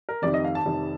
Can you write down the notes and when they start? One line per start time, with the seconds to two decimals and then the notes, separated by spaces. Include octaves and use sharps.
0.09 A#4
0.22 F1 F2 C3 D#3 D5
0.34 D#5
0.45 F5
0.55 A5
0.65 F1 F2 C3 D#3